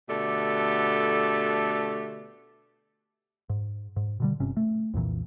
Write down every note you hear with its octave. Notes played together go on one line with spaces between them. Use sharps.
B2 D3 A3 G4 A4 D5
G#2
G#2
B2 D3 G3
G1 C3 C#4
A3
C2 F2 A#2 E3